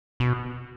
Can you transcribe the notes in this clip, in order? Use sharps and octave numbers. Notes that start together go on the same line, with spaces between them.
B2